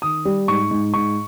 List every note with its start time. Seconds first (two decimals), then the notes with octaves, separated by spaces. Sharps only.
0.02 D#3 D#6
0.25 G3
0.48 G#2 C#6
0.71 G#2
0.94 G#2 C#6